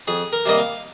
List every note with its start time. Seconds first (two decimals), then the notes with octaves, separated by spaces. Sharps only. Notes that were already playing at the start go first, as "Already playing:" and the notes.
0.07 F2 G#4
0.33 A#4
0.46 C3 G3 A#3 D#5
0.58 F5